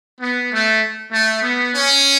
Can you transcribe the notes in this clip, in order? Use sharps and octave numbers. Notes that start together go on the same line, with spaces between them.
B3
A3
A3
B3
C#4